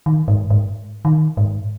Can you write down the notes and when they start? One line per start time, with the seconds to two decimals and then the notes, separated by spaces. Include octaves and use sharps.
0.06 D#3
0.28 G#2
0.50 G#2
1.05 D#3
1.37 G#2